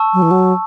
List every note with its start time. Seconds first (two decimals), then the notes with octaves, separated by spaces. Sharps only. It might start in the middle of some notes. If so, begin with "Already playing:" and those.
Already playing: A5 C#6 E6
0.14 F#3
0.22 E3
0.31 F#3